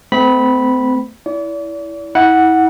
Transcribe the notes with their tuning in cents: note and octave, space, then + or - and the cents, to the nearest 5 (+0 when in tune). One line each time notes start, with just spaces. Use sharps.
A3 +0 C4 -35 B5 -10
E4 +0 D5 -40
E4 -35 F#5 +0